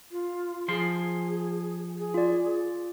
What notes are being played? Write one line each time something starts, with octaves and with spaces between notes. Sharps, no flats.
F4
F3 G#4 C6
G#4
F4 D5